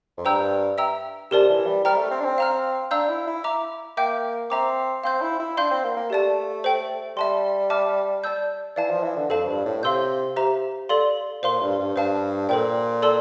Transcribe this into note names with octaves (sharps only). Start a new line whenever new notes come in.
F2
G2 C5 G5 A#5 E6 G6
E5 G5 A#5 E6
C3 G4 A#4 D5 A5
E3
G3
G3 C5 G5 A#5 F6
A3
C4
D4
C4
F5 A#5 F6
D4 F5 A#5 E6 G6
E4
E4
E5 A#5 D6
A#3 E5 G5 D6 G6
C4 E5 A#5 D6
C4 F5 C6 G6
E4
E4
D4 F5 C6 G6
C4
A#3
A#3
A3 G4 D5 A5
A4 C5 G5
G3 E5 A5 C6
E5 A5 D6 F6
D5 A5 E6 G6
E3 D5 F5 A5
F3
E3
D3
F2 A4 C5 F5 A5
G2
A2
C3 F5 C6 E6 G6
G4 C5 E5 A#5
A4 D5 F5 C6
A#2 C5 F5 C6
G2
G2
G2 C5 F5 A5
A#2 A4 C5 G5
A4 D5 A5 C6 E6